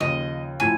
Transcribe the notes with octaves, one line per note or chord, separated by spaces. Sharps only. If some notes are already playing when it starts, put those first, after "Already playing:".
D#2 C#3 F3 D#5
A2 F3 G#5